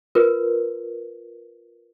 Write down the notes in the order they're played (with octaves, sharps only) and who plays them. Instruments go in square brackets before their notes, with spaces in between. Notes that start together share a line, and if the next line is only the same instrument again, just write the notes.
[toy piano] F4 A#4 B4